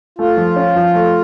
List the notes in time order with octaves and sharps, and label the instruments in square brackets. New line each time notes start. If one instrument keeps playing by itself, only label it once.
[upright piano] A3 [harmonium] F4
[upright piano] F3
C#4
F3
A3